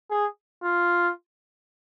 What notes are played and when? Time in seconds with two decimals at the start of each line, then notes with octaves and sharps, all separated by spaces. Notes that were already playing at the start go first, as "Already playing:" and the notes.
0.10 G#4
0.63 F4